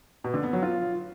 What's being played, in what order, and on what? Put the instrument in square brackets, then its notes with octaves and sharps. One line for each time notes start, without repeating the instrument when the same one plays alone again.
[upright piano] B2
D3
B3
F#3
F4